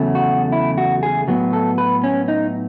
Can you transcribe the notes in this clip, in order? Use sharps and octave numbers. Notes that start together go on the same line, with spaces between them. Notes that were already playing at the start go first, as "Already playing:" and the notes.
Already playing: E2 C#3 F#3 A3
F#4
E4
F#4
G#4
A2 F#3 B3
A4
B4
C#4
D#4